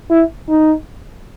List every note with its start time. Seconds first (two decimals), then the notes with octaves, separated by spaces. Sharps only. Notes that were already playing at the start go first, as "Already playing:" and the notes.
0.10 E4
0.49 D#4